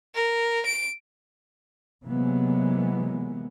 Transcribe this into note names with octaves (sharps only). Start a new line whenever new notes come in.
A#4
D7
C3 E3 F#3 G#3 A#3 B3